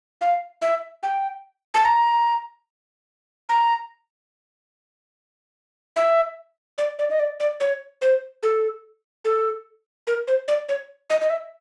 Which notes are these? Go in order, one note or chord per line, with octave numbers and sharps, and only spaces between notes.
F5
E5
G5
A5
A#5
A#5
E5
D5
D5
D#5
D5
D5
C#5
C5
A4
A4
A#4
C5
D5
C#5
D#5
D#5
E5